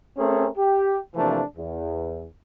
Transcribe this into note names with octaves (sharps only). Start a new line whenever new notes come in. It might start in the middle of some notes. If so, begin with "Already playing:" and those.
A3 C4 C#4 G#4 A#4
G4
C3 E3 F3 A3 A#3 D4
E2